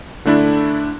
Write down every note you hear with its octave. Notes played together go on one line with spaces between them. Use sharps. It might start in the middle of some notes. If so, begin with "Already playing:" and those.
D3 A3 D4 E4